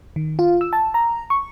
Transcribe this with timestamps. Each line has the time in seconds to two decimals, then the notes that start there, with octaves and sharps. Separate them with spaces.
0.16 D#3
0.39 F4
0.61 E6
0.73 A5
0.94 A#5
1.30 C#6